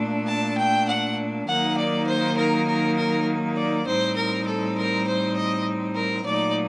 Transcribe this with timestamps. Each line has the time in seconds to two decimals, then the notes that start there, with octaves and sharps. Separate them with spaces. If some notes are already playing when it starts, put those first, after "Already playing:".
Already playing: A#2 A3 D4
0.27 A5
0.57 G5
0.88 F#5
1.47 D#3 F#3 A#3 D#4 F#5
1.76 D5
2.06 C5
2.37 A#4
2.67 A#4
2.96 A#4
3.56 D5
3.86 A2 G3 C4 D#4 C5
4.15 A#4
4.46 A4
4.77 A#4
5.06 C5
5.36 D#5
5.95 A#4
6.25 A#2 F#3 A3 D#4 D5